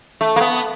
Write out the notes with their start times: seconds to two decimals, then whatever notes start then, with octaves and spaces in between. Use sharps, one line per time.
0.21 A3
0.36 A#3
0.41 B3